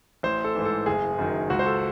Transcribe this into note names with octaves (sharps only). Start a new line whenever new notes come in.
A1 C5
A4
G#2 E3
A4
F#1 G#4
F#2 D#3
C#2 F#4
C5
A4